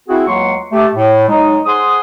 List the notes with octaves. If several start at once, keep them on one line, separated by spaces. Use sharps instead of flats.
C4 E4 F#4 G#4
C#2 F#3 A#3 F#5 C6 C#6
A3 G4
A2
F#3 G#3 D#4
G#4 C5 F#5 C6 D#6